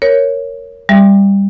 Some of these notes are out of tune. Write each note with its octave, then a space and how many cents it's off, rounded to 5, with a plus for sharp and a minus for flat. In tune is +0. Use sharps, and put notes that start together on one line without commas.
A#4 +0 C#5 +0
G3 +15 E5 +15